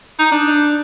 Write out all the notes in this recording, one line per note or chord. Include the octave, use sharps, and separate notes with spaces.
D#4
D4